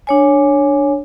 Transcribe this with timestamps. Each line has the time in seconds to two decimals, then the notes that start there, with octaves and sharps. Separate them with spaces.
0.07 D4 C#5 G#5